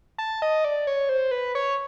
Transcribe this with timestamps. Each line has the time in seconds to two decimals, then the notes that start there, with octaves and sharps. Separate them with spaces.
0.18 A5
0.42 D#5
0.65 D5
0.87 C#5
1.09 C5
1.31 B4
1.55 C#5